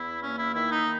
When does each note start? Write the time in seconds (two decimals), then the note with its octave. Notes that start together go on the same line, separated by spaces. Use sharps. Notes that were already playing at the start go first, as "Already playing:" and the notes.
Already playing: E2 B3 E4
0.21 A#3 C#4
0.38 E4
0.54 D#3 E4
0.71 D#4